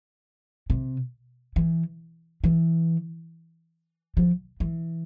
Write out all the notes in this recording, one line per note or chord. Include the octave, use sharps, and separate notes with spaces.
C3
E3
E3
F3
E3